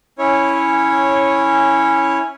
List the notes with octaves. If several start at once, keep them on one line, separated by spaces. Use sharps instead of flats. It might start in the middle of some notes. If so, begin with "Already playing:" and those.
C#4 E4 C#5